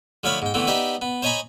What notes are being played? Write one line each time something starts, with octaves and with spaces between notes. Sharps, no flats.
D3 F3 A3 C#5 F5 B5
G#2 G5
D3 E3 A3 B3 C4
B3 D#4 G4 D5 E5
B3
C5 C#5 D#5 G#5 A#5 B5